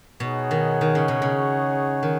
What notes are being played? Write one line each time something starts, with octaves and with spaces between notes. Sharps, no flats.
B2 D#4 G#4 C#5 F#5
D#3
D#3
C#3
B2
C#3
D#3